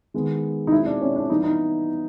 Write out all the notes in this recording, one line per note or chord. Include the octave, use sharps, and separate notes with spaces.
D#3 G#3 B3
D#4
B2 G#3 C4 E4
D4
C#4
D4
E3 G3 B3 D#4
D#4